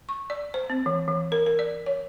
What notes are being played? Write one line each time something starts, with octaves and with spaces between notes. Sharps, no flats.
C#6
D5
C5
C4
E3
E3
A#4
A#4
D5
C#5